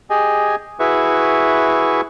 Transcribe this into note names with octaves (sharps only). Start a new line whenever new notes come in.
G4 G#4 D#5 G#5
E4 F#4 G#4 B4 E5 C#6